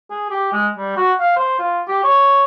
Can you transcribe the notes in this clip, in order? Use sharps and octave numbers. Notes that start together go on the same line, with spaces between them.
G#4
G4
G#3
G3
F#4
F5
C5
F4
G4
C#5